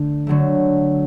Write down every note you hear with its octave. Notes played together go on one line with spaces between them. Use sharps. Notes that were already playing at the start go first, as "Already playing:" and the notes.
Already playing: D3 A3
D3 F#3 A3